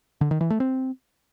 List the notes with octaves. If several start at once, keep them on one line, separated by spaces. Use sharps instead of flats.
D3
D#3
E3
A3
C4